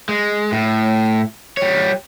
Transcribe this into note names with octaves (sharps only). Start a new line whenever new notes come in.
G#3
A2
G3 C#5